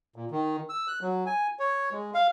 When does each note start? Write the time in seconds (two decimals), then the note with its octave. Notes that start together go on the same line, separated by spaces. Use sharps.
0.16 A#2
0.31 D#3
0.69 E6
0.88 F#6
1.02 F#3
1.26 G#5
1.59 C#5
1.92 G#3
2.14 F5